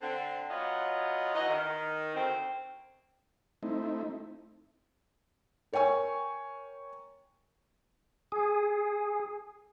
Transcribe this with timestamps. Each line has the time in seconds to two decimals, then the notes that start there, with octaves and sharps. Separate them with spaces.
0.02 D3 C4
0.50 F#3 B3 F4 C#5 D#5
1.35 E3 D#4 F#4 D#5
1.48 D#3
2.15 D2 C4
3.63 A3 C4 D#4 E4
5.73 A#4 C#5 G5 G#5 C#6
8.32 G#4